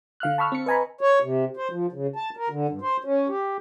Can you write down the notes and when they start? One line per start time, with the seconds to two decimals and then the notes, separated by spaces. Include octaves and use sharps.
0.20 D3 F5 F6 F#6
0.38 A5 B5 C#6 E6 F6
0.52 C4 C#7
0.66 B4 D#5 G#5 A#5 B5
1.01 C#5
1.22 C3
1.57 C5
1.71 F3
1.92 C#3
2.16 A5
2.37 A#4
2.50 D3
2.69 G2
2.82 C5
3.04 C#4
3.29 G4